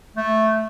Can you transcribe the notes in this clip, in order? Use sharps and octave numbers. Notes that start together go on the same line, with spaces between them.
A3